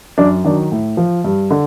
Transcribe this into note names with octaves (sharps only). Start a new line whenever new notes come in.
F#2 D4
D#3 F#3 D4
A2
F3
G2
D3